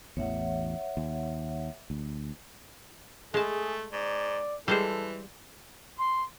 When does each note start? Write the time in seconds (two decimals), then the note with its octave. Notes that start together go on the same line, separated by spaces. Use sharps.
0.17 A1 E2 C#5 E5 F#5
0.97 D#2
1.90 D2
3.34 G#3 A3 G#4 A5
3.93 G#2 D5
4.68 E3 G3 G#3 A4 C5
5.97 C6